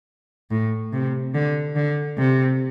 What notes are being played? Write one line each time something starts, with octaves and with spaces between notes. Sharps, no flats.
A2
C3
D3
D3
C3